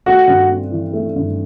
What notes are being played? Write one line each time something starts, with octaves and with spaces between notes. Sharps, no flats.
A3 F#4
G2
C4
E3
A3
G2